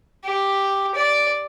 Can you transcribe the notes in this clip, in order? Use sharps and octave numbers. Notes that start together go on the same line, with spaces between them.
G4
D5